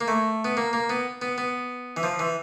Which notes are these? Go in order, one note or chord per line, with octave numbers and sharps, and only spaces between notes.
A#3
A3
B3
A#3
A#3
B3
B3
B3
E3
F3
E3